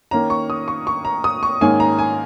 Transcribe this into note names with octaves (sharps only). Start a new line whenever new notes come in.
D#3 A#3 C#4 A#5
C#6
D#6
C#6
C#6
A#5
D#6
C#6
G#2 D#3 A#3 C#4 G#5
A#5
G#5